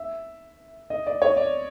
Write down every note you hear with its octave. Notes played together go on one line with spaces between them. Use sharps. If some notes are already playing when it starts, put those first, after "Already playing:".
Already playing: E5
D#5
D5
C#5
D5